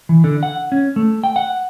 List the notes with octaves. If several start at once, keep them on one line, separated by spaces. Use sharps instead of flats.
E3
D3
F#5
C#4
A3
G5
F#5